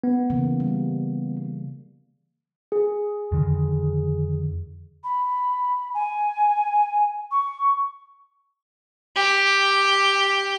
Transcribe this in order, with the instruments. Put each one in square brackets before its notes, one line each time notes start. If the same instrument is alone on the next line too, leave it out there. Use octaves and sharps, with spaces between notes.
[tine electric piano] B3
[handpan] C#3 E3 A#3
G3
[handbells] G#4
[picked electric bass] F2 D3 D#3
[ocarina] B5
G#5
C#6
[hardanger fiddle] G4